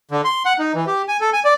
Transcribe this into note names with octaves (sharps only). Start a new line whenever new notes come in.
D3
C6
F#5
D#4
E3
G4
G#5
A4
G#5
D5